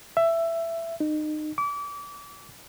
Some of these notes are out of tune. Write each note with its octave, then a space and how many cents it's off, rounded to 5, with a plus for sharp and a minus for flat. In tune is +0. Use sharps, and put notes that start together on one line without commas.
E5 +15
D#4 -30
D6 -30